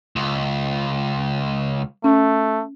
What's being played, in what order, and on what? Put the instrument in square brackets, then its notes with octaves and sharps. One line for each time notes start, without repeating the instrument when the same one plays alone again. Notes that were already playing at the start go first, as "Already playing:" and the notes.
[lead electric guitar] C#2
[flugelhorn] A3 [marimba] C#4